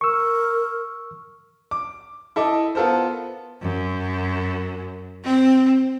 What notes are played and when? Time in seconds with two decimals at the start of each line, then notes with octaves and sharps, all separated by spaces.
0.01 A#4 C#6 E6
1.71 D6
2.36 E4 A4 D#5 D6
2.75 B3 F4 A4 A#4 C5
3.61 F#2
5.24 C4